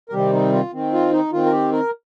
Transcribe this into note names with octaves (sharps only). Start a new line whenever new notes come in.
A#4
C3 D#3 G3 C4 G4
D#4
F4
D#3 C4
F4
D#4
D#3 C4 F4
A#4
G4
A#4